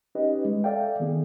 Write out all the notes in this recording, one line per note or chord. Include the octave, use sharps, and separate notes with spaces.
C#4 D#4 G4 B4 D#5
G#3
A4 D5 E5 F5 G5
D#3 B3 G#4